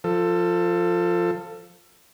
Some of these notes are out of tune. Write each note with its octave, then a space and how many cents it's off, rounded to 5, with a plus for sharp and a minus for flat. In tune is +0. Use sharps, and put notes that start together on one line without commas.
F3 +0 A4 +20